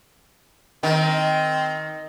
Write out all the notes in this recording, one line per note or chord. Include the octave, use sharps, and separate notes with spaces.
D#3 C4